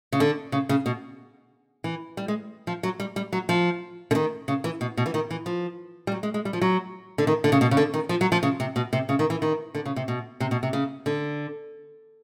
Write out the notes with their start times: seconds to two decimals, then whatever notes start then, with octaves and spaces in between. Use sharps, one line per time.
0.12 C#3
0.20 D3
0.52 C#3
0.69 C#3
0.86 B2
1.84 E3
2.17 G3
2.28 G#3
2.67 F3
2.83 F#3
3.00 G3
3.16 G3
3.33 F#3
3.49 F3
4.11 D3
4.15 D#3
4.48 C#3
4.64 E3
4.81 B2
4.97 B2
5.06 E3
5.14 D#3
5.31 E3
5.46 F3
6.07 G3
6.12 F#3
6.23 G#3
6.34 G#3
6.45 G3
6.53 F3
6.61 F#3
7.18 D3
7.27 D#3
7.44 D3
7.52 C#3
7.61 B2
7.71 C#3
7.77 D3
7.94 D#3
8.09 F3
8.21 F#3
8.32 F3
8.43 C#3
8.60 C3
8.76 B2
8.93 C3
9.09 C#3
9.19 D#3
9.30 E3
9.42 D#3
9.75 D3
9.85 C#3
9.96 C3
10.08 B2
10.40 C3
10.51 B2
10.63 C3
10.73 C#3
11.06 D3